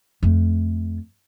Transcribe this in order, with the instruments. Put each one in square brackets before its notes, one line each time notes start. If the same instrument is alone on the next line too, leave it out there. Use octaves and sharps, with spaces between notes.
[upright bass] F2 A3